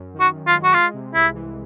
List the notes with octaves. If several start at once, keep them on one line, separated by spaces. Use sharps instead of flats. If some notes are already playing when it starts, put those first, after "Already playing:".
Already playing: F#2
D#3
F#4
F#2
F4
G#3
F#4
G#3 F4
C3
C2 E4
E3